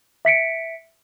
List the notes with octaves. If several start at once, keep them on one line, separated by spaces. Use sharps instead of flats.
E5 B6 C#7 D7